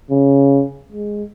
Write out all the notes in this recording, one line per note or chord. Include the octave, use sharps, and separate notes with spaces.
C#3
G#3